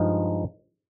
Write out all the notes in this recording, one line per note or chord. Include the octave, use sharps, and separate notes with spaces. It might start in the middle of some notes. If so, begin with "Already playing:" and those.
Already playing: G2 F3 G#3 D#4